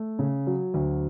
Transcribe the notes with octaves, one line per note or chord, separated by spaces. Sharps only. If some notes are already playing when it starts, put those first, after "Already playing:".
Already playing: A3
C#3
F#3
D2